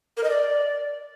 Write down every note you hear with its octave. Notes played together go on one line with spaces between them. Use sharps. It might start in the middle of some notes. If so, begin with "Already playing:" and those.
A#4
D#5
D5